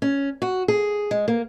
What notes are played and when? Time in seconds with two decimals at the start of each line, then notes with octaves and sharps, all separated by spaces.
0.02 C#4
0.42 F#4
0.68 G#4
1.11 G#3
1.28 A#3